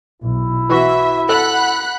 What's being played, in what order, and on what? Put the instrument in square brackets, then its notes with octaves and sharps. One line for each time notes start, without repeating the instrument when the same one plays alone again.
[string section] B1 [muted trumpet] E4
[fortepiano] E3 F#4 [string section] E5
[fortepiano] A4 [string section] F#5 B5 F#6